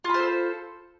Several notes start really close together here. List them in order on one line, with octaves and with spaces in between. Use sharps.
F4 B5 C5 A4